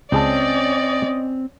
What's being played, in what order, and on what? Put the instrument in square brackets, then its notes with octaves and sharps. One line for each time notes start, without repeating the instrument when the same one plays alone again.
[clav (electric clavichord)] C#2 G#4 A5 [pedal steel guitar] C4 [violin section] C#4 D5 [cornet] D#5